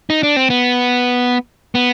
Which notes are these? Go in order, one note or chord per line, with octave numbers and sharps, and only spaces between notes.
D#4
D4
C4
B3
B3